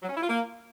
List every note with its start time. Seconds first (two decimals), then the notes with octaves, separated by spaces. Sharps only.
0.03 F#3
0.09 C#4
0.16 E4
0.22 F4
0.28 A#3